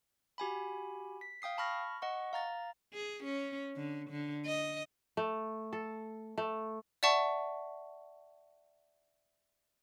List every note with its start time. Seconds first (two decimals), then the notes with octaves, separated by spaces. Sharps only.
0.38 F#4 G4 G#5 B5
1.21 B6
1.42 F5 G5 D#6 C7
1.58 A5 B5 C#6 F6 A#6
2.02 D#5 F#5 C#6
2.33 F5 A#5 A6
2.93 G#4
3.24 C#4
3.77 D3
4.10 D3
4.46 D#5
5.17 A3
5.73 A4
6.38 A3
7.03 D5 E5 F#5 A5 C#6